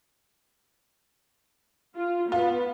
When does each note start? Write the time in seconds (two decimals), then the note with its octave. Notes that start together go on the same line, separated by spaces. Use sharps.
1.96 F4
2.32 B3 F4